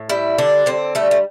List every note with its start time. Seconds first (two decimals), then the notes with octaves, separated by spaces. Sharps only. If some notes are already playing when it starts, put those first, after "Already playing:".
Already playing: A2
0.09 G3 E4
0.38 D3 D4
0.66 D3 C4
0.95 G3 A3
1.11 A3